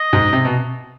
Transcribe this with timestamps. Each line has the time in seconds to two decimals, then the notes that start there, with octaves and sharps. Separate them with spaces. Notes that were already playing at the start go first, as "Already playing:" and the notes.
Already playing: D#5
0.13 G#2
0.33 C3
0.45 B2